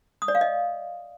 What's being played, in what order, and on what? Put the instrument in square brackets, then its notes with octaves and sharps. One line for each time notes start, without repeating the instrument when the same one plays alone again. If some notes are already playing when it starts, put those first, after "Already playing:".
[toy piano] D#6
D5
F5
D#5